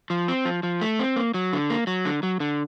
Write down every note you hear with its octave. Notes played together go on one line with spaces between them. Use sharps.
F3
C4
F3
F3
A3
C4
A#3
F#3
D3
A#3
F#3
D3
F#3
D3